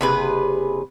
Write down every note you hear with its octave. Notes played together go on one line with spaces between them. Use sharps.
F#1 C3 G#4 B4